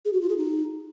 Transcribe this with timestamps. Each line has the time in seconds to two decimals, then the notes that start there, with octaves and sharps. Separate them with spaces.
0.05 G#4
0.13 F#4
0.21 F4
0.29 G#4
0.37 D#4